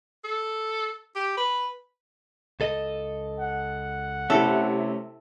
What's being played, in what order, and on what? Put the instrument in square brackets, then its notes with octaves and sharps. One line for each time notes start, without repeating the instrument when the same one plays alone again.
[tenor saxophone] A4
G4
B4
[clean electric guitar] C#2 A4 D#5
[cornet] F#5
[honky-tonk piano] C3 E4 [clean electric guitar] A3 C#4 [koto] A4